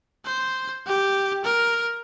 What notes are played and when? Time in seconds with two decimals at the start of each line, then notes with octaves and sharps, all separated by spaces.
0.25 C5
0.86 G4
1.44 A#4